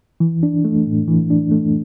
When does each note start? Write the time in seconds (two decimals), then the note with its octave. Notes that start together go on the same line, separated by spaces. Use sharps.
0.20 E3
0.43 D4
0.64 A3
0.87 A2
1.08 E3
1.30 D4
1.51 A3